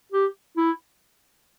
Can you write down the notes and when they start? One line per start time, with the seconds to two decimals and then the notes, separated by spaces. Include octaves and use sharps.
0.12 G4
0.57 E4